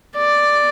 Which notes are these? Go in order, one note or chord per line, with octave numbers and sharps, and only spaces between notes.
D5